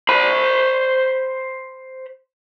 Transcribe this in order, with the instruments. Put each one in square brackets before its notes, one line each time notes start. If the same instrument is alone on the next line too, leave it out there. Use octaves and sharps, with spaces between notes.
[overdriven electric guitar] C5 B5